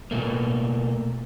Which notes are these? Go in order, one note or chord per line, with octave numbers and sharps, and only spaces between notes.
B2 A3 A#3